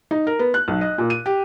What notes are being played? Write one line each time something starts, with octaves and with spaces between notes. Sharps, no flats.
D#4
A#4
B3
F#6
B1
D#5
A#2
D#7
G4